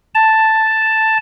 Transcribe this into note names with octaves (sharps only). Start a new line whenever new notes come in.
A5